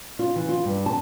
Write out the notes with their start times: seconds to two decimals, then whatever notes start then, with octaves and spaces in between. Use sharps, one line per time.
0.19 F4
0.36 E3
0.49 F4
0.65 G2
0.86 A5